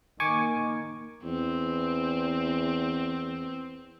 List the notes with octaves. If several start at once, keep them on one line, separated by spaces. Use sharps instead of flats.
D#3 A#3 G#5 C#6 D6
E2 C4